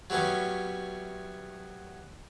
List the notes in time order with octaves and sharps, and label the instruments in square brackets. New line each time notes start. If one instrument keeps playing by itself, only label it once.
[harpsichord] F#3 G3 A3 B3 C#4